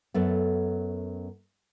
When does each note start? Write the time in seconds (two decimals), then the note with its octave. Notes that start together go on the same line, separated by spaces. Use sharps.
0.14 F#2 A3 B3